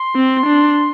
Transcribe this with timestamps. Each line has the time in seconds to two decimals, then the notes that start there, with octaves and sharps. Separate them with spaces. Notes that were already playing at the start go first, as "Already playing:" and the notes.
Already playing: C6
0.16 C4
0.46 D4